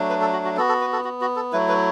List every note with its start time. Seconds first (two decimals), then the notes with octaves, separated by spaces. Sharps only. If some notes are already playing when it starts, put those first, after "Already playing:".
Already playing: F#3 A3 D4
0.09 B4
0.21 A4
0.33 F#4
0.45 F#4
0.57 B3 F#4 A4
0.69 A4
0.81 B4
0.93 A4
1.04 F#4
1.21 F#4
1.36 A4
1.52 F#3 A3 E4 B4
1.69 B4